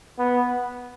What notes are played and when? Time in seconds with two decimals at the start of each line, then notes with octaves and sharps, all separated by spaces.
0.19 B3